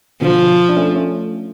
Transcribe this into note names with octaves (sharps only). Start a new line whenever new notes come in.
B2 D3 F3
D4
A3 C#4
A3 C#4